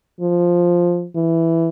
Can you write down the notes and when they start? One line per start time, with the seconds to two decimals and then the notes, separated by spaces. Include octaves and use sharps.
0.21 F3
1.16 E3